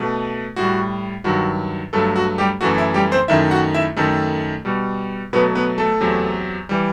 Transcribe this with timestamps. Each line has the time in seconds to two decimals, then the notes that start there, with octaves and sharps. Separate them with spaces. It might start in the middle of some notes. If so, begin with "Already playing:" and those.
Already playing: B2 A3
0.56 A2 G3 F#4
1.24 G2 D#3 F#3 F#4
1.93 G2 F#3 A3 A4
2.16 F#4
2.38 G3 G4
2.61 F#2 E3 A3 F#4
2.78 E4
2.94 G3 G4
3.11 C4 C5
3.28 F#2 D#3 A3 E4 E5
3.51 F#4 F#5
3.74 E4 E5
3.96 F#2 D#3 A3 A4
4.65 B2 G3
5.33 B2 F#3 A3 B3 B4
5.55 B3 B4
5.78 A3 A4
6.01 E2 C3 F#3
6.69 E3 G3